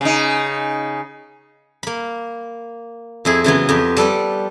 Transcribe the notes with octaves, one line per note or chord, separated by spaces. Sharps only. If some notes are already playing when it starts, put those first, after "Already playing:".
C#3 D#4
A#3 B5
F2 E4 G#4
C#3 E3 F#3 B3
F2 B3 G4
G3 A4 B4 D5